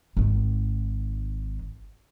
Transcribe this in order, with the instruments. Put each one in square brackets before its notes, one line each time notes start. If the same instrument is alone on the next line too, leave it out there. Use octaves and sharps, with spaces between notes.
[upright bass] G#1 D#3